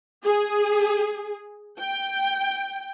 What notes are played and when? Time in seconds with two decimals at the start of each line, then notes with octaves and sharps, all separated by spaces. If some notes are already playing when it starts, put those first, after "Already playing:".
0.25 G#4
1.80 G5